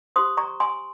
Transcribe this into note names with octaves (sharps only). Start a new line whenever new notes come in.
G4 C5 C6 D#6
A#5 C#6
G#5 C6